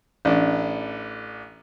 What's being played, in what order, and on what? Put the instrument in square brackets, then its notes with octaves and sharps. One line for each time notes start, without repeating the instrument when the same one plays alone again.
[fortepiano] A1 D4